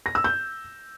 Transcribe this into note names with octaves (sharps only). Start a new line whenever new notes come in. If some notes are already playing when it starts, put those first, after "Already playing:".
A#6
E6
G6